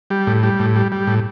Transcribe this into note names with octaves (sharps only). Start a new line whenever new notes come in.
G3
A2
G3
A2
G3
G3
A2